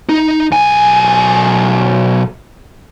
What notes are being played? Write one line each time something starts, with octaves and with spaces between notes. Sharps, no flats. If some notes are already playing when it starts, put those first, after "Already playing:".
D#4
B1 G#5